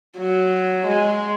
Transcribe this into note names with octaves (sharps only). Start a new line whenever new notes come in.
F#3
G#3